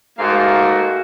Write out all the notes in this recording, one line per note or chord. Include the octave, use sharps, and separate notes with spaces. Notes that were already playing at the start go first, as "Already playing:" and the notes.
G#2 A3 A#3 F#4 F5